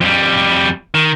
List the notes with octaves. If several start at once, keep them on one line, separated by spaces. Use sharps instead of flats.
F2 G3
D#3